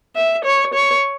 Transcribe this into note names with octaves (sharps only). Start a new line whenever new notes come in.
E5
C#5
C#5